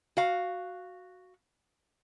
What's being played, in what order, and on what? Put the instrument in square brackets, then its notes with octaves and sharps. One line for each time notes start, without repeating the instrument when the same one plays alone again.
[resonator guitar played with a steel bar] F#4 F5